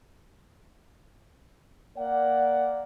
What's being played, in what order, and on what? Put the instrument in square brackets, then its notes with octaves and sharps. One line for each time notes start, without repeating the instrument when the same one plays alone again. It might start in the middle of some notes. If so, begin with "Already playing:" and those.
[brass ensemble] A#3 D5 F#5